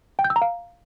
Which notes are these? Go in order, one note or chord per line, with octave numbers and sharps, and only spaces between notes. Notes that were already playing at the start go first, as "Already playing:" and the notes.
G5
G6
E6
A#5
F5